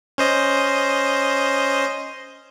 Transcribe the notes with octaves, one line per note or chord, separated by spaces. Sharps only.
C#4 C5 D#5